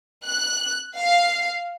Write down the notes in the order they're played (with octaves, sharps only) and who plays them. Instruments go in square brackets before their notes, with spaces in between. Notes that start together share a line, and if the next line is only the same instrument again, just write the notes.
[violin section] F#6
F5